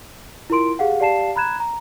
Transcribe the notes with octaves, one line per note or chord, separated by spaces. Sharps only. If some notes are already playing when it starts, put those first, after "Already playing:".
E4 F4 A#4 C6 D7
G4 G#4 F5 F#5
G4 D5 F5 A5 C7 E7
A#5 B5 F#6 G#6 E7
A#5